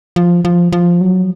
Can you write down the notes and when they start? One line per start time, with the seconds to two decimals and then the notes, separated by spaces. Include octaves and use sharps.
0.16 F3
0.45 F3
0.72 F3
1.01 F#3